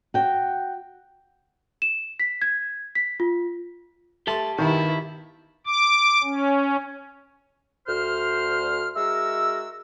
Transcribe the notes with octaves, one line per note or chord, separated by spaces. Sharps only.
F#4 G5
E7
B6
G#6
B6
F4
A3 G4 A5 C6
G2 B2 D#3 E4
D6
C#4
D2 C5 F6
G#3 E4 F#4 A#4 E6